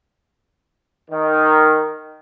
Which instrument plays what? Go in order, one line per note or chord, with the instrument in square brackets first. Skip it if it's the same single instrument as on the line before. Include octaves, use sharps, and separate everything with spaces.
[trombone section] D#3